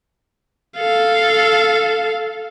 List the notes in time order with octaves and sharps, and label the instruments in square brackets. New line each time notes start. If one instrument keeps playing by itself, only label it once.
[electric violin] A4 F5